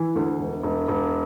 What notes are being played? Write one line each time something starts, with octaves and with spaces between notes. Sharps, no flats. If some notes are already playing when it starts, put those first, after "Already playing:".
Already playing: E3
D2
E1
E1
E1